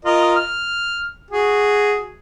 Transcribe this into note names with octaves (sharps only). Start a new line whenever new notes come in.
F4 A#4 D#5
F6
F#4 G#4